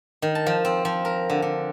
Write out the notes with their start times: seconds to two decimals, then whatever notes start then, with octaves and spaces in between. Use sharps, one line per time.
0.22 D#3
0.35 A5
0.46 F3
0.65 C4
0.85 F3
1.05 A#4
1.30 D3
1.42 D3